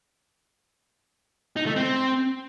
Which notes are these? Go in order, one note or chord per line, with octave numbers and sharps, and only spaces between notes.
D#4
A3
C4